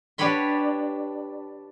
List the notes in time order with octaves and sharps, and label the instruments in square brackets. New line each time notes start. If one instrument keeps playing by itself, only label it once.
[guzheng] D4 G4 B4 C#5 B5 C6